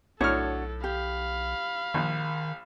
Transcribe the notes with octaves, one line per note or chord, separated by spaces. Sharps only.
B1 A2 D4 F#4 A4 C#5 F6
G4 F5 B5
A#1 D#3